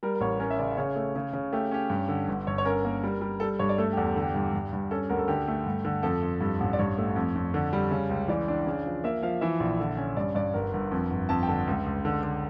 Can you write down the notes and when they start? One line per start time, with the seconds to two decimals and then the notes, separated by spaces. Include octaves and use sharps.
0.03 G3 A#4
0.15 A#4
0.21 A1 C#5
0.39 C#4 A#4
0.51 E5
0.59 C#3 D5
0.77 C#3 C#5
0.96 A3
1.16 C#3
1.33 C#3
1.53 A3 G4
1.71 C#4 G4
1.90 G2
2.08 D3
2.28 G1
2.47 G1 C#5
2.58 C#5
2.65 C#4 A#4
2.85 A#3
3.04 G3
3.21 G3
3.40 G3 A4
3.59 G2 C#5
3.69 D5
3.78 A3 A4
3.93 G4
3.97 E2 A4
4.06 G4
4.16 D3
4.22 G4
4.35 G2
4.53 G2
4.73 G2
4.91 C#4 A4
5.09 D2 A#4
5.18 A4
5.28 D3 G4
5.48 A3
5.66 G2
5.85 D3
6.03 F2 A4
6.23 F2
6.41 G2
6.60 A1
6.73 D5
6.79 G2 C#5
6.98 A3
7.16 F2
7.35 F2
7.54 D3
7.73 G3
7.91 C#3
8.09 C#2
8.28 E3 D5
8.48 D4
8.67 C#3
8.86 F3
9.04 A#3 E5
9.22 F3 F5
9.41 E3 E5
9.60 A#1
9.80 D3
9.97 C#4
10.17 G2 D5
10.35 G2 D5
10.54 G1 A#4
10.74 G1
10.91 F2
11.11 G1
11.29 F2 A5
11.43 G5
11.48 D3 A5
11.67 C#2
11.86 C#2
12.05 D3
12.23 D3